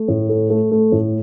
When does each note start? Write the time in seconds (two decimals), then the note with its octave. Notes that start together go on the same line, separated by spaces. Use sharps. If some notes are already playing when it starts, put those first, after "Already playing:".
Already playing: A3
0.08 A2
0.29 A3
0.50 A3
0.71 A3
0.92 A2